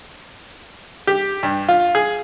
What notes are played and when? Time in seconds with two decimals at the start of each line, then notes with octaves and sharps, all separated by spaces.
1.07 G4
1.43 G2
1.69 F4
1.95 G#4